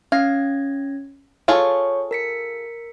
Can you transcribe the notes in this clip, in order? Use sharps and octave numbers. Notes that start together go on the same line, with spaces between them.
C#4 F5 G#6 A#6
F4 G#4 A4 C#5 C#6
A#4 B6 C#7